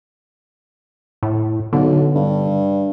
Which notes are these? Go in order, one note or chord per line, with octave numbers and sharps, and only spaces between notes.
A2
B1 D3
G2